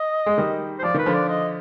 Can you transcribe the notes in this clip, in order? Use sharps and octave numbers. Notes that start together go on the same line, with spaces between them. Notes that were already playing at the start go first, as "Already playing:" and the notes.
Already playing: D#5
G#3
D#3 G3
C5
F3 D5
D#3 B4
D3 F3
D5
D#5